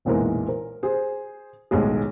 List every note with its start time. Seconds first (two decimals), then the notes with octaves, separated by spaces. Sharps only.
0.05 F1 B1 A#2 E3 G#3 A#4
0.48 A#4
0.83 G#4 C5
1.71 D#1 B1 A2 G#3 G#4